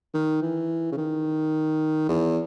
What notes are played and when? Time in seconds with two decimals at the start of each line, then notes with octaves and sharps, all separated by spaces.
0.14 D#3
0.42 E3
0.92 C#3
0.97 D#3
2.09 E2